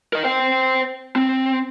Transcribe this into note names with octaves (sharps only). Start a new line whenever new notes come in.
A#4 D#5
C5 G5
C4